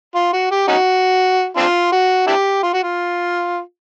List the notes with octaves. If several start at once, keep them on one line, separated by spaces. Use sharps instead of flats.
F4
F#4
G4
C#4 D#4 F#4
C4 D4 F4
F#4
D4 E4 G4
F4
F#4
F4